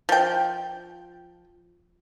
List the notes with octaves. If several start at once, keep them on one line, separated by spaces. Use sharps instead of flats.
F3 G5